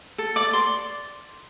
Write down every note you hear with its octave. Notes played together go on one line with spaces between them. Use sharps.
A4
D5 D6
D5 C6